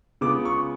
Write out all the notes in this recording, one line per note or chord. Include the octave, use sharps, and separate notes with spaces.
C#3 G#3 B3 F4 D6
C#6